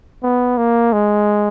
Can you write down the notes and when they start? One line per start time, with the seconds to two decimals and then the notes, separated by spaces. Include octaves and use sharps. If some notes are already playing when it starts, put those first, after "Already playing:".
0.23 B3
0.58 A#3
0.93 G#3